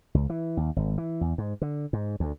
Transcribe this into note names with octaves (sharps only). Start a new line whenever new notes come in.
C#2
E3
D#2
G#1
E3
E2
G#2
D3
G#2
D2